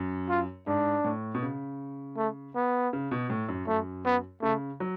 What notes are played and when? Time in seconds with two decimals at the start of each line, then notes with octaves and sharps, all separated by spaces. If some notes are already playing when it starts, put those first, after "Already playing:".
Already playing: F#2
0.29 F4
0.67 G#2 D4
1.04 A2
1.35 B2
1.42 C#3
2.17 A3
2.55 B3
2.93 C#3
3.11 B2
3.30 A2
3.49 F#2
3.67 F#2 A3
4.05 B3
4.42 C#3 A3
4.80 F#3